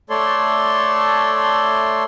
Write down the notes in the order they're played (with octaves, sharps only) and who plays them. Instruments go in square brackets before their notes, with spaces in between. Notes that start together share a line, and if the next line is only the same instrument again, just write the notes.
[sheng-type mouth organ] A3 A4 C#5 D5 C6